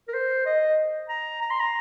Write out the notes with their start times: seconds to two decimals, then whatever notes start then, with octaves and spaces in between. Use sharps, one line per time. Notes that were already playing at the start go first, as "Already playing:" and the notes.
0.08 A#4
0.14 C5
0.46 D#5
1.09 A#5
1.42 A#5
1.50 C6
1.60 A#5